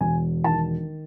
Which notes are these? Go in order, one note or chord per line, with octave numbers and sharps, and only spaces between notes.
E1 G#5
D#3 A5